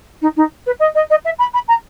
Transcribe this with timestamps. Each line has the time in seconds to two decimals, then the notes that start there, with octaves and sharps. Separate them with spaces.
0.21 D#4
0.36 D#4
0.66 B4
0.80 D#5
0.95 D#5
1.10 D#5
1.25 E5
1.38 B5
1.54 B5
1.68 A#5